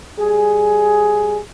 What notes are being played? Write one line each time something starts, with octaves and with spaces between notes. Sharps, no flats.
G3 G#4